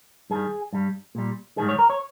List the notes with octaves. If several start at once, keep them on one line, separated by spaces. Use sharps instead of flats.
G2 D#3 G3 G#4
G2 G3
A#2 G3
G#2 D#3 G3 G#4
C#5
A#4
C#5